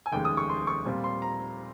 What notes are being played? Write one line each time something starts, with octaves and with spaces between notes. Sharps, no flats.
G#5
F1 D#2 C#3 G#3 G5
D#6
C#6
C6
C#6
A#2 G3 C4 F4
C6
A#5